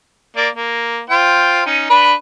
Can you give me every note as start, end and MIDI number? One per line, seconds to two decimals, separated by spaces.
0.36 0.48 58
0.36 0.48 74
0.56 1.00 58
1.10 1.64 65
1.10 1.64 72
1.10 1.64 79
1.66 1.90 61
1.66 1.90 63
1.90 2.14 62
1.90 2.14 71
1.90 2.14 83